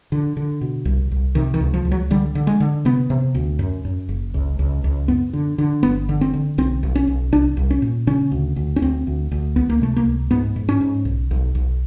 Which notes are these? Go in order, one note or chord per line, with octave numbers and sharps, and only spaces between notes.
D3
D3
B2
C2
C2
C3 D#3
D#3
C#2
F3
C#2
F#3
D3 G3
D3
G#3
D3
C3 B3
C3
D2
F#2
F#2
F#1
C#2
C#2
C#2
F#2 B3
D3
D3
G1 B3
D3
C4
D3
B1 C4
B1
C#4
B1
C2 D4
C2
C#4
A#2
C#3 C#4
D2
D2
C#4
D2 C4
D2
D2
C#2 B3
A#3
C3 A3
A#3
C#2
G#2 B3
G#2
C#4
G#2
B1
B1
B1